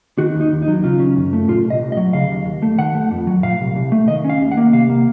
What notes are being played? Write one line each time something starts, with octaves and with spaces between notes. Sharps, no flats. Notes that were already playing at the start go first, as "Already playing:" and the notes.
D#3 F#4
D#2
D#4
D#2
D#4
F#3
C#3 F4
C#4
F#2
A3
A#2 F4
C2
D#5
C2
D#5
F#3
C#3 F5
D#2
D#2
A3
D#3 F#5
A3
F2
F#3
A#2 F5
C2
C2
A3
D#3 D#5
C#4
F5
D#2
F#5
A#3
C3 F5
A#3